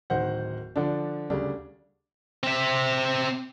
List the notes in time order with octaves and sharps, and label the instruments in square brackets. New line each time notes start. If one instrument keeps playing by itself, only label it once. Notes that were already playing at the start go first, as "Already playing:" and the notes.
[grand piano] D1 D#3 C5 F#5
D3 F3 D4
D2 C#3 G3 A3 D4
[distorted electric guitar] C4 E5